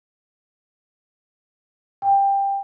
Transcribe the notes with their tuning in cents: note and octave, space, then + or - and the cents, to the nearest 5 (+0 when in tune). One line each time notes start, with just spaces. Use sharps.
G5 +15